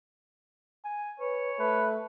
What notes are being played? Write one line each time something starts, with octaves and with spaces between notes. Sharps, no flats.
G#5
B4 C#5
A3 B4